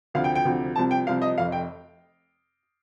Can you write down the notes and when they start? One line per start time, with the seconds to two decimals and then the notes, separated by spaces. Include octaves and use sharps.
0.14 D2 C3 F3 F5
0.24 G5
0.35 G5
0.45 D2 C3 F3
0.76 C2 C3 F3 A5
0.91 G5
1.07 C2 C3 F3 F5
1.22 D#5
1.38 F1 F2 C3 F5
1.52 G5